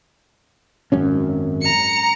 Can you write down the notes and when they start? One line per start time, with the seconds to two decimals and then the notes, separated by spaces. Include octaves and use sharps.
0.92 G#1 F#2 C#4
1.62 A#5 C#7